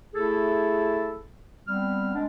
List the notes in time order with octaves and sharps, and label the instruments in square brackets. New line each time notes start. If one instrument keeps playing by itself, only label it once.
[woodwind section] A3 E4 G#4 A4
G3 B3 C4 F6
G#3 D4